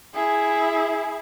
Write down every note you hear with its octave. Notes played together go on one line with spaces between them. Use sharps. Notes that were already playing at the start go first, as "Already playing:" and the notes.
E4 G#4